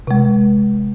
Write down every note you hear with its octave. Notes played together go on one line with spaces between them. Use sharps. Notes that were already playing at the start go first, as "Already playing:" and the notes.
C3 G#3